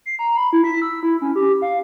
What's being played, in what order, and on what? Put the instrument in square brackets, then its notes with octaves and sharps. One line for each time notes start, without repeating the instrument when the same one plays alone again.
[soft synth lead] C7
A#5
B5
E4
B6
E6
E4
C#4
G4
F5